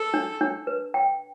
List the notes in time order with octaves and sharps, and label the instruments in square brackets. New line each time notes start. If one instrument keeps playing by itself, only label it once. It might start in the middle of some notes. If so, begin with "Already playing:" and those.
Already playing: [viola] A4
[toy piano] D4
D4
B4
G5